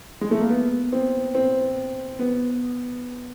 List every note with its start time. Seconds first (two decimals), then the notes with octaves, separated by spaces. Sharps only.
0.21 G#3
0.31 A3
0.41 A#3
0.49 B3
0.92 C4
1.35 C4
2.19 B3